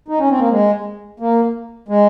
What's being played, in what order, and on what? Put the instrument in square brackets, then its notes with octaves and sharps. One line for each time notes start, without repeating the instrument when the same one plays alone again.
[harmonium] D#4
C#4
C4
A#3
G#3
A#3
G#3